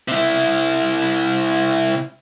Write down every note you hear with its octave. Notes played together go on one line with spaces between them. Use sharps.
C3 E4